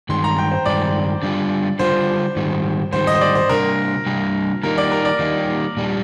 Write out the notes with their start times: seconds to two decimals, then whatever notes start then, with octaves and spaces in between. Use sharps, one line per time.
0.09 G2 D#3 G#3 C6
0.24 A#5
0.38 G5
0.51 C5
0.65 G2 D#3 G#3 D5
1.23 D3 G3 D4 F4
1.79 D3 G3 D4 F4 C5
2.36 G#2 D#3 G3
2.93 G#2 D#3 G3 C5
3.07 D#5
3.15 C5
3.21 D5
3.35 C5
3.49 C3 G3 D4 A#4
4.06 C3 G3 D4
4.63 D#3 G3 A#3 D#4 A#4
4.78 D5
4.92 A#4
5.05 D5
5.19 D#3 G3 A#3 D#4
5.77 A#2 G3 D4